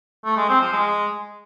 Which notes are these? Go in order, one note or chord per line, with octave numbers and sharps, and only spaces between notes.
A3
G#3
C4
F3
G#3